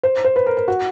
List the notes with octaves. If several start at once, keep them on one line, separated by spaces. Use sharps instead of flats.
C5
C5
B4
A#4
A#4
F#4